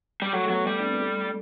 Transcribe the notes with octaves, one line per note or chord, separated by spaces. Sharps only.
G3
F#3 A3
A3
F#3 B3
G3
D4
C4
B3
A3